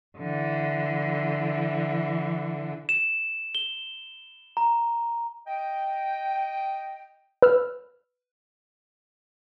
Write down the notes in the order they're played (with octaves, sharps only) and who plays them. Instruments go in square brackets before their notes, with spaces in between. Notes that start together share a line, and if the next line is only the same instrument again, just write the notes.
[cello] D3 E3
[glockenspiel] E7
G7
A#5
[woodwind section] D#5 G5
[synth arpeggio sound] B4 E6 F6